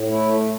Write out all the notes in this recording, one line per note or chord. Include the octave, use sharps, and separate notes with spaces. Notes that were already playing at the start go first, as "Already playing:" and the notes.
Already playing: A2
A3 E4